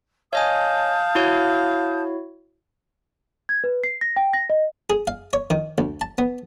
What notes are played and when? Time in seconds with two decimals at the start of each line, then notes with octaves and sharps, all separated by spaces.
0.33 C#5 D#5 F5 G#5 A5 D#6 G6
1.15 E4 F#4 C#5
3.49 G#6
3.64 B4
3.84 C7
4.01 A#6
4.16 G5
4.33 A#6
4.50 D#5
4.90 G#4
5.07 F5
5.33 C#5
5.50 D#3
5.78 D2
6.01 A5
6.18 B3